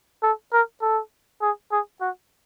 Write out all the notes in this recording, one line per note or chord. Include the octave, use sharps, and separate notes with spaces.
A4
A#4
A4
G#4
G#4
F#4